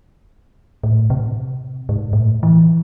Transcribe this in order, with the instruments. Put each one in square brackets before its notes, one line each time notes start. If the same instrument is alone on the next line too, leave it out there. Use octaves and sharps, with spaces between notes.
[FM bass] A2
C3
G#2
A2
E3